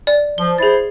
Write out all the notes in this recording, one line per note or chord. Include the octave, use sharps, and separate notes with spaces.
D5
F3 G7
E4 G#4 C5 A6